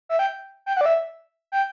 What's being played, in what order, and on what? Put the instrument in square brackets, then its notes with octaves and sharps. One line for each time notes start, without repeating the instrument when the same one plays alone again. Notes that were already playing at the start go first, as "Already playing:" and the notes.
[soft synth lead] E5
G5
G5
F#5
D5
E5
G5